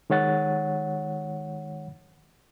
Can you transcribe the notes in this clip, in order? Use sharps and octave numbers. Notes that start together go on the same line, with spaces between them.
D#3 G#3 C#5 F#5 A6